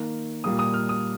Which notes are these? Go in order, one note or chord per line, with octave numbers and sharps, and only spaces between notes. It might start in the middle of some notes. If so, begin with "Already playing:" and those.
Already playing: D#3 A#3
A#2 G3 A#3 D#6
D#6
F6
D#6